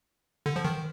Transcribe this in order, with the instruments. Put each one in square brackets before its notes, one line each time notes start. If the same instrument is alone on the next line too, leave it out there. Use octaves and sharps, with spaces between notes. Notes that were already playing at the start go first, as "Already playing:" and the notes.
[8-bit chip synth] D3
F3
D#3